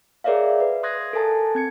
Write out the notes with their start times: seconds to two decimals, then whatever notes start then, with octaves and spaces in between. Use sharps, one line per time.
0.24 G#4 A#4 C#5 D5 E5 F5
0.60 B4
0.83 C6 D#6 F#6 G#6 A#6
1.13 A4 A#4 G#5 A5 A6
1.55 C4 G#6 C#7